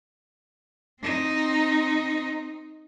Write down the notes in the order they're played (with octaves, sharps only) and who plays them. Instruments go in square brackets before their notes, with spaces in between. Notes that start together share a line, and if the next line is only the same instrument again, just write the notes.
[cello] C4 D#4